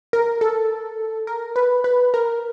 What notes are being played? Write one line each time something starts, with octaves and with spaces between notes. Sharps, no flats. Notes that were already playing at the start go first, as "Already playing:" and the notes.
A#4
A4
A#4
B4
B4
A#4